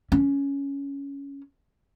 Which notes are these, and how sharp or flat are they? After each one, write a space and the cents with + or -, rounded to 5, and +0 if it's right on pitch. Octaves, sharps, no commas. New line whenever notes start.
C#4 +10